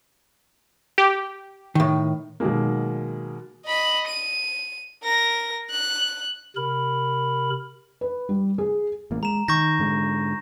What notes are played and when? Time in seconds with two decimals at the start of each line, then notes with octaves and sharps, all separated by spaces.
0.98 G4
1.75 A2 D#3
2.40 B2 D#3 F#3 G#3 A#3
3.65 D#5 B5
4.07 D#7
5.03 A#4 A#6
5.71 F#6
6.56 C3 A#4 B5
8.01 B4
8.29 G3
8.58 G#4
9.11 A1 A#3
9.23 G#3 A#5 E7
9.48 D#3 C#6 G6 A#6
9.79 G#2 D3 G#3